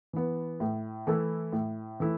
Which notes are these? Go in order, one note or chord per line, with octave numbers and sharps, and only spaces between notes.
E3 B3
A2
E3 A3 E4 A4
A2
E3 A3 E4